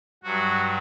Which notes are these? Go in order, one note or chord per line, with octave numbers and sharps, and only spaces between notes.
G2 F#3 F#4